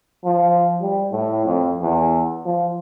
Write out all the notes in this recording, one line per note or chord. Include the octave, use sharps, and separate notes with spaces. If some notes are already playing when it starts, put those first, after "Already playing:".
F3
G3
A2
F2
E2
F3